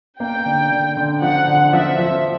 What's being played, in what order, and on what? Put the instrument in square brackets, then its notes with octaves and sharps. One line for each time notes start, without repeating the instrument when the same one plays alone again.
[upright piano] A#3 [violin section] G5
[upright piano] D3
D3
D3
[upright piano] F3 [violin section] F#5
[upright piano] D3
[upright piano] F3 [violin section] E5
[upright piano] F3